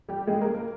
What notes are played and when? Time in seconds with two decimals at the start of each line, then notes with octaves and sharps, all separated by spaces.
0.09 G3 G4
0.27 G#3 G#4
0.41 A#3 A#4
0.54 A#3 A#4